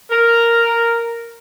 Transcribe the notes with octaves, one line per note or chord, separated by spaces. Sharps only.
A#4